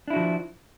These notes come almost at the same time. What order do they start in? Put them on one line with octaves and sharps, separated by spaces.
D4 E4 F#4 F3